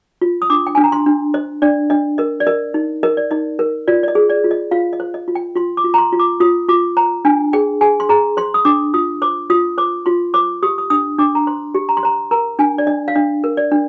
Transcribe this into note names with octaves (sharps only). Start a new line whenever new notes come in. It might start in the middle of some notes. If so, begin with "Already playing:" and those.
F4
D#6
D4 D6
G5
D4 G#5
A#5
C6
D4
C5 D#5
D4 D5
D4 D#5
A#4 D#5
D5
A#4 D#5
D#4
A#4 D#5
D5
D#4 D#5
A#4
F4 D5
D5
D#5
G#4
D5
F4
D#5
F4 F5
D#5
C5
D#5
F4
G5
F4 C6
D6
F4
A#5
C6
F4
D6
F4 D#6
F4 D6
C5 A#5
D4 G#5
G#4 G5
G#4 G#5
C6
G#4 A#5
C5 C6
D#6
D4 D6
F4 D#6
C5 D6
F4 D#6
C5 D6
F4 C6
C5 D6
G4 D#6
D#6
D4 D#6
D4 D6
A#5
C5 C6
G4
A#5
C6
C5 A#5
A#4 A#5
D4 G#5
D5
D4 D#5
F5
D4 D#5
A#4
D5
D4